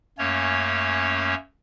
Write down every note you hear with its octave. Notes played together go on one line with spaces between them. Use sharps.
F#2 A3 A#3 C#4 C#5